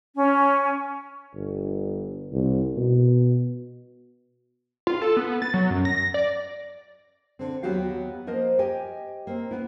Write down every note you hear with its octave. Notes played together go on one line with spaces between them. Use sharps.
C#4
G1
C2
B2
F4
A4
B3
A6
F#3
F#2
A#6
D5
D3 C4
D#2 F#3 B3 F#4 G4 F5
F3 A#3 A#4 C5 D#5
G4 D#5 G5 G#5
A#3 C4
A#3 B3 E4